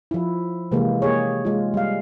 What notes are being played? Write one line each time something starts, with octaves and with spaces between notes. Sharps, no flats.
F3 E4
C3 E3 G#3 A#3
A#3 G4 G#4 C#5
G#3 F4
G3 F5